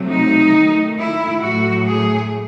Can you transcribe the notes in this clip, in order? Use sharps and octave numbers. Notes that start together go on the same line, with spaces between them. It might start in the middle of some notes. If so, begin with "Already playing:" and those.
Already playing: C3 F#3 A3
D#4
D#3 A3
E4
A2 F#3 A3 F#4
G#4